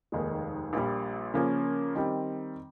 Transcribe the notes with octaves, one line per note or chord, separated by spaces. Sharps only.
F1 D#2 D#3 G#3
A#1 A#2 G3
C#3 F3 A#3 C#4
D#3 G3 C4